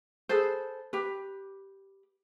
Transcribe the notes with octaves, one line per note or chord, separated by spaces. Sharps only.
G#4 A4 B4 C5
G4 B4